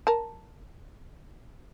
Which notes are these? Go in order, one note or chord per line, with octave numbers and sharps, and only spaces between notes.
A#4 A5